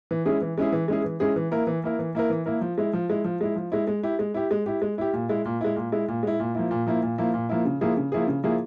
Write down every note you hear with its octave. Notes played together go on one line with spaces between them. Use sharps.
E3
G#3 C#4 E4 G#4
E3
G#3 C#4 E4 G#4
E3
G#3 C#4 E4 G#4
E3
G#3 C#4 E4 G#4
E3
A#3 E4 A#4
E3
A#3 E4 A#4
E3
A#3 E4 A#4
E3
A#3 E4 A#4
F3
G#3 E4
F3
G#3 E4
F3
G#3 E4
F3
G#3 E4
G#3
E4 G4
G#3
E4 G4
G#3
E4 G4
G#3
E4 G4
A#2
G#3 E4
A#2
G#3 E4
A#2
G#3 E4
A#2
G#3 E4
A#2
F3 A#3 E4
A#2
F3 A#3 E4
A#2
F3 A#3 E4
A#2
F3 A#3 E4
C#3
F3 A#3 E4 G#4
C#3
F3 A#3 E4 G#4
C#3
F3 A#3 E4 G#4